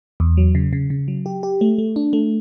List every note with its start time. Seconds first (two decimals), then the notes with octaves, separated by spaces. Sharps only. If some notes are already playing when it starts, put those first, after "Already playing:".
0.20 E2
0.37 F#3
0.55 C#3
0.73 C#3
0.90 C#3
1.08 F#3
1.26 G4
1.43 G4
1.61 A3
1.78 A3
1.96 D4
2.13 A3